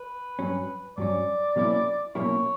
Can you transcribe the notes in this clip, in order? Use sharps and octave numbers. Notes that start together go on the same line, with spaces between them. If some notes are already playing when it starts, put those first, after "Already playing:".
Already playing: B4
G2 F#3 C#4
G2 F#3 C#4 D5
B2 F#3 A#3 C#4 E4
B2 F#3 A#3 C#4 E4 C#5